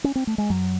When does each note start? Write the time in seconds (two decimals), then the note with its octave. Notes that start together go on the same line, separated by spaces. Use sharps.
0.04 C#4
0.15 C4
0.27 A3
0.38 G#3
0.50 F#2 F#3